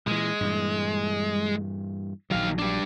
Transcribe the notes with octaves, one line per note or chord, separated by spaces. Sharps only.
A#2 E3 G#3
G2 A#2 E3
A#1 D#3 F#3 F5
G3 D4